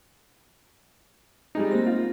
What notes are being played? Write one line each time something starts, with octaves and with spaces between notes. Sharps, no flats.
G3 G#3 D#4
A#3 C4 A#6
F4